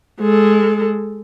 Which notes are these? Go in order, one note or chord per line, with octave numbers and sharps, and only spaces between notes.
G#3 A4